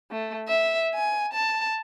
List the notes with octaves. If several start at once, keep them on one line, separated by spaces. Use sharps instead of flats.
A3
E5
G#5
A5